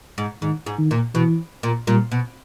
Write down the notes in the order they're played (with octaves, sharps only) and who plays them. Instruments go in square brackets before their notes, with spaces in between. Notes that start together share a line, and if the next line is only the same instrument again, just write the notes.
[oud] G#2
[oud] G#2 [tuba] D#3
[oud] G#2
[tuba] D#3
[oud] A#2
[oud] B2 [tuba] E3
[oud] A#2
[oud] A#2 [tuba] G3
[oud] B2